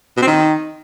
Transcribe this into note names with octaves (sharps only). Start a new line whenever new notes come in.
B2
C4
D#3